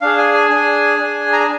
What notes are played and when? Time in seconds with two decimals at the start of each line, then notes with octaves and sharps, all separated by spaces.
0.01 D4 G#4 F5
0.18 G#5
0.34 G#5
0.50 D4 G#4 G#5
0.99 D4 G#4
1.33 A#5
1.40 G#5